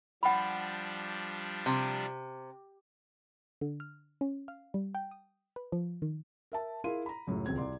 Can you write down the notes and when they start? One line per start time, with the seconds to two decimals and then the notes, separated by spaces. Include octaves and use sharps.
0.23 F3 G3 D4 F#5 B5
1.66 C3
3.61 D3
3.80 F6
4.21 C#4
4.48 F5
4.74 G3
4.95 G5
5.11 D#6
5.56 B4
5.72 F3
6.02 D#3
6.52 A#4 E5 A5
6.84 E4 G#4 A#4 F5 C6 D#7
7.06 A#5 B5
7.27 C#2 F#2 A2
7.46 D#1 C#2 C4 G#6
7.58 C2 D5 C6